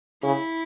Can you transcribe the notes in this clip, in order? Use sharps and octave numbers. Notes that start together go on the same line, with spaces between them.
C#3 E4